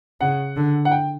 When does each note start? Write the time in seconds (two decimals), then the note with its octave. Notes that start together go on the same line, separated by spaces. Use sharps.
0.21 C#3 F#5
0.57 D3
0.85 F#5
0.91 G5